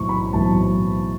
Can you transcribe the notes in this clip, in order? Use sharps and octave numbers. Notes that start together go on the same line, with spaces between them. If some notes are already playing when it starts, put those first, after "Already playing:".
Already playing: B1 A2 E3 C#6
B5
B1 A2 E3 A5